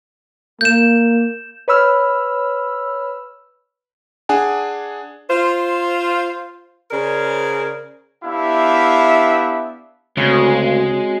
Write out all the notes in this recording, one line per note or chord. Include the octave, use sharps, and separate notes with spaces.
A#3 G6 E7
B4 C#5 B5 E6 F6
D4 G#4 F#5 G#5
F4 C5
C#3 G#4 A#4 C5 D5
B3 D4 E4 G4 E5 F5
D2 C#3 G#3 C4 F#4 C#5